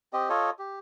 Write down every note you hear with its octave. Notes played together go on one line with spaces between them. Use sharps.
C4 G4 D#5
F4 A4 C#5 D#5
G4